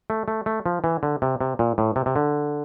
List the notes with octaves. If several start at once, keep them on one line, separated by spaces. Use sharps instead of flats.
A3
A3
A3
F3
E3
D3
C3
C3
A#2
A2
C3
C3
D3